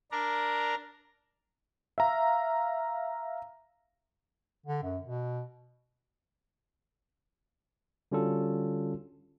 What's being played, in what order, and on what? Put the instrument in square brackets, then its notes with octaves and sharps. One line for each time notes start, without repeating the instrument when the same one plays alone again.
[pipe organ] D4 A#4 A#5
[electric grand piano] E5 F5 A#5
[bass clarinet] D3
F#2
B2
[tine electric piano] D3 G3 C#4 F4 F#4 A4